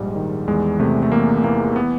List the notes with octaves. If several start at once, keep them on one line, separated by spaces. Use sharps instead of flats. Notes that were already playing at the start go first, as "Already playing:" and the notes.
Already playing: A#1 G#2 G3 G#3
D#3
E2 G#3
C3 A3
A3
E2 A#3
E3 A#3
B3